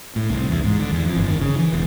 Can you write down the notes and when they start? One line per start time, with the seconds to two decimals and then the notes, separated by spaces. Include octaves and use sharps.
0.16 A2
0.30 C2
0.49 E2
0.64 G#2
0.79 D3
0.91 E2
1.05 F2
1.17 G1
1.29 D#3
1.41 C#3
1.58 E3
1.73 E1